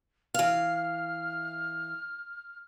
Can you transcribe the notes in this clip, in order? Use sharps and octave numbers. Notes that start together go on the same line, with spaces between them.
E3 F5 F6